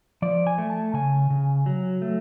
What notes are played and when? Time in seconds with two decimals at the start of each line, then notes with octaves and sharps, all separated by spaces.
0.22 F3 D5
0.47 G#5
0.58 A3
0.70 A5
0.94 C#3 G#5
1.30 C#3
1.66 F#3
2.02 A3